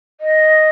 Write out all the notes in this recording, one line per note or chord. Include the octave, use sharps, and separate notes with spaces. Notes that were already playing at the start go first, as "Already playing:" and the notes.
D#5